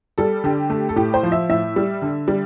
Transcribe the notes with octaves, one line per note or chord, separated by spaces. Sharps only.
G3 A4
D3 G4
A3
A4
A2 G4
C5
F3
E5
A2 E5
G3
D3
G3